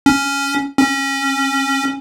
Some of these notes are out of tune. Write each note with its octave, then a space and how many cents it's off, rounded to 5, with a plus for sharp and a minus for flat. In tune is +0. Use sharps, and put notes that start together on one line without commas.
C#4 +5
C#4 -20